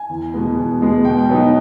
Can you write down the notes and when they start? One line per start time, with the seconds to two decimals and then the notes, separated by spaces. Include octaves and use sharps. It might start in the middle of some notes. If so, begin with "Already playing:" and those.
Already playing: G#5
0.09 E2
0.34 B2 G#3 B3
0.57 E2
0.81 B2 G#3 B3
1.05 B2 G5
1.29 F#3 B3 D#4